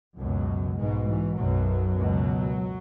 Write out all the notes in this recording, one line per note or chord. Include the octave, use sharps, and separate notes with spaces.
C#2 F#2 B2 F#3
B1 G#2 B2 G#3
E3
B1 F#2 B2 F#3
C#2 B2